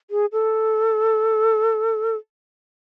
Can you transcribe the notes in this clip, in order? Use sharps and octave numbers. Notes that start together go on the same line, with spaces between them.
G#4
A4